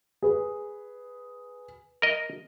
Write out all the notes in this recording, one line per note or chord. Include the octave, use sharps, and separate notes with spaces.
G#4 B4
A#4 D#5